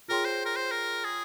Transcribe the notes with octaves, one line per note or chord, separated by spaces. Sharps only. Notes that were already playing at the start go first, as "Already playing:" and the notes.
F4 G#4 A#4 C#5 G5 C6
C5
A#4
C5
A#4
G#4